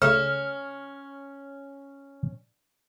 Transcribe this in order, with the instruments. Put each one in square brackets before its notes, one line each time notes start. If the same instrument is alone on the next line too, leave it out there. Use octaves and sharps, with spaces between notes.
[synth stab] C#2 A3 E7 [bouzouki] C#4 [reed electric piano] F6